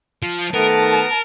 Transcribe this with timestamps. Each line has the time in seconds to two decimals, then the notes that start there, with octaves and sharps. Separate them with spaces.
0.23 F3
0.54 D#3 A3 B3 A4 A#4 A5